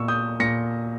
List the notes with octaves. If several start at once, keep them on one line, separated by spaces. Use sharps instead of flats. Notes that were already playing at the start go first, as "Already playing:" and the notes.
Already playing: A#2 C#6 E6
D#6 G6
A#2 A#6 C#7